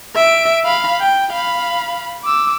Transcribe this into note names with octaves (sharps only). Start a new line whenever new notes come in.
E5 D7
F5 B5
G5
F5 B5
D6 E6